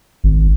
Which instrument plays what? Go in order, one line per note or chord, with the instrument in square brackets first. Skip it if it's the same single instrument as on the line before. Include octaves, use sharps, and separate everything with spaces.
[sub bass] G#1